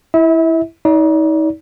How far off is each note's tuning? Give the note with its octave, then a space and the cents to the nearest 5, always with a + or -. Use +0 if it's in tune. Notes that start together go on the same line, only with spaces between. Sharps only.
E4 +0 E5 -35
D#4 +35 D5 -35